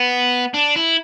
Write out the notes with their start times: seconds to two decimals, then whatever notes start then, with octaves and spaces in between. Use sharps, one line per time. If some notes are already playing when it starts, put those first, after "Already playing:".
Already playing: B3
0.54 D4
0.76 E4